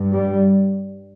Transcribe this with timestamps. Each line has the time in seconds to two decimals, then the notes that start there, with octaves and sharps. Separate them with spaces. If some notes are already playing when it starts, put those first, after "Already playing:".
Already playing: G2
0.13 G3